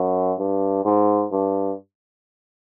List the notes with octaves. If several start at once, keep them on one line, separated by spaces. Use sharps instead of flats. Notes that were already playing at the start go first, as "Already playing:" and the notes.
Already playing: F#2
G2
G#2
G2